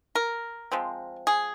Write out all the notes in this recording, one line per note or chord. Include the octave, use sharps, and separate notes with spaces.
A#4
F3 G#3 C4
G#4